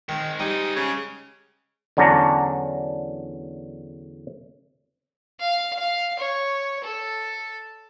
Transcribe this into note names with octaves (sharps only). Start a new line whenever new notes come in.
D#3 G#3 C4
G3 D#4
C#3
E2 D3 F#3 C#4 D4 A#5
F5
F5
C#5
A4